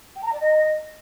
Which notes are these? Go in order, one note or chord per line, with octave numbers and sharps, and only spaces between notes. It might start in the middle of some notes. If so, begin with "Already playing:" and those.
G5
A5
A#5
D5
D#5